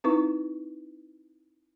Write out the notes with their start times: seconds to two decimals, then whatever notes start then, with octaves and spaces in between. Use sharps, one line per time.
0.04 C4 D#4 E4 B4 C#6